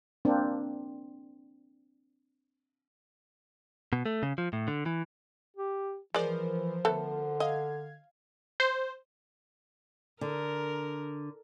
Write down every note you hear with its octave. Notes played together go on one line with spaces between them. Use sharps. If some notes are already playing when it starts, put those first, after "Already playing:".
A#3 C4 D4
B2
A3
C#3
F3
A2
D3
E3
G4
E3 F3 G#3 A#4 C5 D5
D3 A3 B3 A4
D#5 F5 G#6
C5
D3 A#4